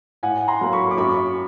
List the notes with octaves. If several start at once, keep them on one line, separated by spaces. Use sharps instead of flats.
A2 F#5 G#5
A#5 C6
F#3 A#3
B5 C#6
D6
F#2 B5 C#6